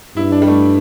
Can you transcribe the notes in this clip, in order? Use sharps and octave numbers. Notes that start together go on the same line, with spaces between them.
G2 E4
D4
G3
A3